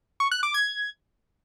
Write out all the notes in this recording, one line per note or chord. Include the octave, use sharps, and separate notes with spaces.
C#6
F#6
D6
G#6